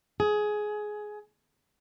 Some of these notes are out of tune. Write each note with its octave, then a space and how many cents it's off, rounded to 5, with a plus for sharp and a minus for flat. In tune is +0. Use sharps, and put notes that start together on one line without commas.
G#4 +15